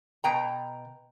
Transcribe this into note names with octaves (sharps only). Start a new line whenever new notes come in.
B2 G5 A#5